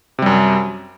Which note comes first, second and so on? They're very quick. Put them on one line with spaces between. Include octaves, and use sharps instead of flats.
C3 G3 F#2